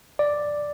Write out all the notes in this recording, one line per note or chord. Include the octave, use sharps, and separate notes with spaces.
D5